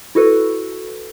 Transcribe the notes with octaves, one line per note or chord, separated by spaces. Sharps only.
E4 F#4 A4 B4